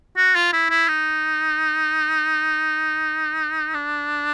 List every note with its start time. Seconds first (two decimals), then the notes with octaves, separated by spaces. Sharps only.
0.17 F#4
0.35 F4
0.53 E4
0.70 E4
0.88 D#4
3.74 D4